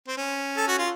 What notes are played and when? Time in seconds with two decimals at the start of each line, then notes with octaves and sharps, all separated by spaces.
0.08 C4
0.17 C#4
0.57 A4
0.68 F#4
0.79 F4